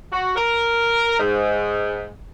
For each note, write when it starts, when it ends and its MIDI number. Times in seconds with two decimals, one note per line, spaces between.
0.12 0.34 66
0.36 1.16 70
1.19 2.11 44